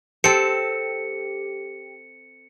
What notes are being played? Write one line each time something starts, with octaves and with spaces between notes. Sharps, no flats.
C4 G4 A4 C#7